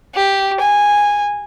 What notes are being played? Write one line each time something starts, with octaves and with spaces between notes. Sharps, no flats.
G4
G#5